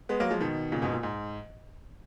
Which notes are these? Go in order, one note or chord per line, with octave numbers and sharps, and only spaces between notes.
G#3 B3
F#3 A#3
F3 G#3
B2 D#3
A#2 C#3
G#2 B2
A#2
G#2